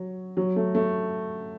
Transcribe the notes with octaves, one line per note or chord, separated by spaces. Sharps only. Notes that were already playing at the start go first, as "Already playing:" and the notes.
Already playing: F#3
F#3
A3
A3